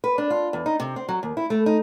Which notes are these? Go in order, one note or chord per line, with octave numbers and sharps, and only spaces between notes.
B4
D4
F4
E2
D#4
C3
C4
F#3
D#2
E4
A3
D#4